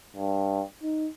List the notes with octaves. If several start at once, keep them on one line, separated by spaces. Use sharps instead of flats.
G2
D#4